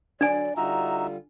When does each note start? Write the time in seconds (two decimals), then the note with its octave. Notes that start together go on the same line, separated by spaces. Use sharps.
0.21 D3 F#3 D4 D5 G#5
0.57 D3 G3 D#4 F4 F#4 E5 A#5